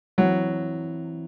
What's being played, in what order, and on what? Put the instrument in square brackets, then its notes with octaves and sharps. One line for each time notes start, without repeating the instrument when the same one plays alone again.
[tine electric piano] E3 C4 E4 [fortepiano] F#3